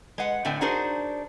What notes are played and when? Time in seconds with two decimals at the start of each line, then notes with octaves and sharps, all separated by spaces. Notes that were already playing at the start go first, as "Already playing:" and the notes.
0.18 G#3 B4 F#5
0.45 A2 D3 C4 G5 G#5
0.61 D4 D#4 F#4 G#4 A#4 C5